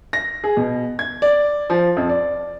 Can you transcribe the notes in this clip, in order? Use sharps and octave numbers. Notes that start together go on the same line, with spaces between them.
A#6
G#4
B2
G#6
D5
F3
F2
D5